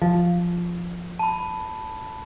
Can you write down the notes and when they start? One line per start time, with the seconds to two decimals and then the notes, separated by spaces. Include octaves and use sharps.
0.02 F3
1.19 A5 B5